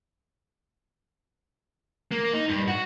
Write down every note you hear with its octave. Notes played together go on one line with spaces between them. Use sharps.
A#3
D#4
G2
F#4